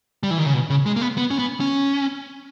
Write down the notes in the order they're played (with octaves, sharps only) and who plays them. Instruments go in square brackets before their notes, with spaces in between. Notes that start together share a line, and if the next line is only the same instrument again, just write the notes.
[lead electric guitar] G3
E3
D#3
C#3
B2
C#3
G#3
A#3
B3
B3
C#4
B3
C#4